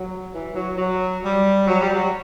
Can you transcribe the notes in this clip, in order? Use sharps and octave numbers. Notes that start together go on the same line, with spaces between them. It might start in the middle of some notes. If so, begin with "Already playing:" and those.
Already playing: F#3
E3
F#3
F#3
G3
F#3
G3
F#3